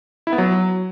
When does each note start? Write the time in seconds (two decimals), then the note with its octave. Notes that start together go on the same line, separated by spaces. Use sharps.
0.27 E4
0.33 B3
0.38 F#3